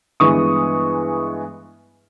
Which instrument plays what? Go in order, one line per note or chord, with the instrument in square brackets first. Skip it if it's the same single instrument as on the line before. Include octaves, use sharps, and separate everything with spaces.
[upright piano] G2 E3 G#3 B3 C#6 D#6